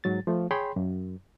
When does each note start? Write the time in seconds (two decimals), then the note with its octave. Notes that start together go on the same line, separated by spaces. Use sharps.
0.04 G#2 F#3 A6
0.27 F3 A3
0.51 G#4 C#5 G5 B5 C6
0.76 F#2